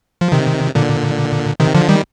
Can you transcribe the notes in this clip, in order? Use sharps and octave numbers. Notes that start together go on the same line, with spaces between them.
F3
C3 D#3
A#2 D3
C3 D#3
D3 F3
D#3 G3